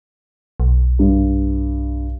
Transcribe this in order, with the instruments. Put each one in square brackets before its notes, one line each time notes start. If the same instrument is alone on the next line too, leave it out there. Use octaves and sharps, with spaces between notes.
[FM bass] B1
[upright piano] G2